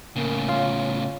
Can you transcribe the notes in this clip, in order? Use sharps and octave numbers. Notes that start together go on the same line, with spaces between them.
A2 C#3 A#3
F4 C#5